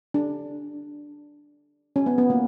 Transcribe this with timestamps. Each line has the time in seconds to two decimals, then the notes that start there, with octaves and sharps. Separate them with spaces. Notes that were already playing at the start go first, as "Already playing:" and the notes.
0.14 D4
1.96 C#4
2.06 B3
2.18 B3
2.30 A#3